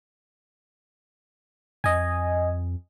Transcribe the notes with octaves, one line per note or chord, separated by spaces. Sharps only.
F2 D#5 G#5